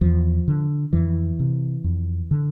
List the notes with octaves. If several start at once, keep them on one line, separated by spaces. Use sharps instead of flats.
E2 F3
D3
F2 E3
C3
F2
D3